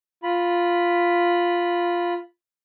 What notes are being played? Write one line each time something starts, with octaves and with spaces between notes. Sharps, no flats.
F4 B5